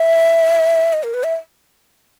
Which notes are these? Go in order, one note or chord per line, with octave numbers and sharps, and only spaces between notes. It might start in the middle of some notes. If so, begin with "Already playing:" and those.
Already playing: E5
D#5
A#4
B4
E5